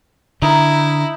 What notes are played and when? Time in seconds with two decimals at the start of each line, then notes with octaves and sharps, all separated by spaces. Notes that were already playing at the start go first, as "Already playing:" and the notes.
0.42 D3 D#4 E4 A#4